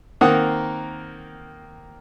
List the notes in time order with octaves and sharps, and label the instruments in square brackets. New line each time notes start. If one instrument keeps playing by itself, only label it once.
[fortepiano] D#3 A#3 C4 F#5 D#6